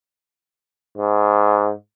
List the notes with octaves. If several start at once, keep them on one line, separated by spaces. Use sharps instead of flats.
G#2